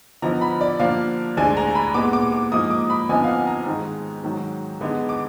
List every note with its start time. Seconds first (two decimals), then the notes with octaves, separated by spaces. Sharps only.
0.22 D3 F3 B3 D#4 A#5
0.41 B5
0.61 D5
0.80 D3 F3 A#3 D4 F5
1.37 D2 D3 G#3 D4 G#5
1.57 A#5
1.75 B5
1.94 A#2 G#3 B3 D6
2.13 D6
2.32 D6
2.52 G#2 F3 A#3 D#4 D#6
2.70 D6
2.90 B5
3.09 F2 D3 F3 B3 D#4 G#5
3.24 F5
3.28 F#5
3.47 A#5
3.66 G#2 D#3 G#3
4.23 G#2 D#3 F#3
4.81 D3 G#3 B3 D#4
5.09 D6